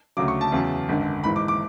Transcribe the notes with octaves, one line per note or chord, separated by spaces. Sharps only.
D2 C#3 F#3 D6
C#6
A5
E2 C#3 F#3
G#1 F#2 D3
G#1 G#2 E3 B5
D6
D6